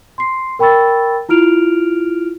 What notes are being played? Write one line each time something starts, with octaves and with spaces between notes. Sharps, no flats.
C6 C7
A#4 G5 B5 C#6 E6 A6
E4 F4 F6 D7 F7